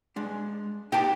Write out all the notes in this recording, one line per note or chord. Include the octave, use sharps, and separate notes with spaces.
G#3 D4
D#4 G4 G5 A5